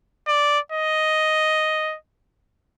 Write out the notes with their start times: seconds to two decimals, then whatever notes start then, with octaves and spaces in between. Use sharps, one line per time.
0.28 D5
0.72 D#5